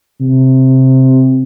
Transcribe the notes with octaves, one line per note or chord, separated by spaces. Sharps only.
C3